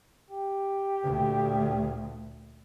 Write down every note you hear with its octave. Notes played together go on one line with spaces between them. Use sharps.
G4
D2 A#2